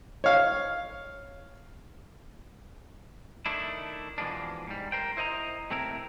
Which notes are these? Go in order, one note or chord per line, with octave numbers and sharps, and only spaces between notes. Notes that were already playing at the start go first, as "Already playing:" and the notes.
C#5 F5
D#3 A3 D4 E4
B2 E3 F3 G#3 D4
G#2 G3
A#4 C5 G5
E4 C5 D#5 F#5 A#5
C3 A3 C4 E4 A#4